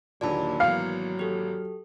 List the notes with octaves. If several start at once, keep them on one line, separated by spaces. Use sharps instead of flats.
D#2 A#2 D3 F#3 D5 A5 B5
G#1 E3 F#3 A#3 B3 F5 C#7
G4 A4